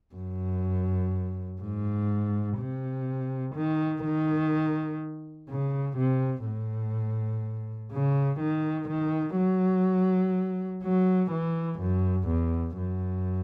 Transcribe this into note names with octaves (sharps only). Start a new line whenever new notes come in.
F#2
G#2
C3
D#3
D#3
C#3
C3
A2
C#3
D#3
D#3
F#3
F#3
E3
F#2
E2
F#2